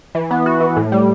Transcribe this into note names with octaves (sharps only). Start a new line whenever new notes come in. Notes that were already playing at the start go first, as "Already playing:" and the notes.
E3
B3
F#4
E3
A2
G3